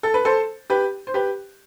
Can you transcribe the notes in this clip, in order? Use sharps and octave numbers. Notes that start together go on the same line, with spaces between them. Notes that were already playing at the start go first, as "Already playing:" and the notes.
A4
B4
A4 C5
G4 B4
C5
G4 B4